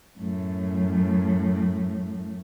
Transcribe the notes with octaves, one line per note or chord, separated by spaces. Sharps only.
F#2 A2